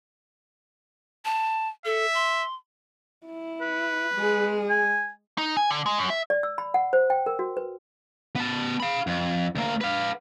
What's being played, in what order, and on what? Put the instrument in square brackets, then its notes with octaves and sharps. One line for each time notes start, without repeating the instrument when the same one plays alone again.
[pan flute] A5
[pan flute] A4 [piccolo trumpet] E5
[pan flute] C6
[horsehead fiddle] E4
[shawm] B4
[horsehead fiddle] G#3 G#4
[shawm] G#5
[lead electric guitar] D#4
G#5
D3
G#3
F#2
E5
[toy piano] D5
E6
B5
F#5
C5
G5
A#4
F#4
B4
[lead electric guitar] B3 A5
F5 B5
F2
D2 A#3
B4 F5